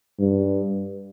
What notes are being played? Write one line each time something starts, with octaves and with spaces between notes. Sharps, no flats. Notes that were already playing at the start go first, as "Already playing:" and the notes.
G2